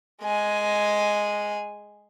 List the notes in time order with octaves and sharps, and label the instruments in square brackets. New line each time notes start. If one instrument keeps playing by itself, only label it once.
[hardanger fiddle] G#3 G#5